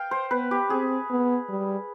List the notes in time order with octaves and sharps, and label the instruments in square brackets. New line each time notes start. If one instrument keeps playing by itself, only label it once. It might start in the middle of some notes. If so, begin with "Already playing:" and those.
Already playing: [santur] F5 G5
C5
[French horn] B3 [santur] B4
[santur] G4
[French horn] C4 [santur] G#4
[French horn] B3
G3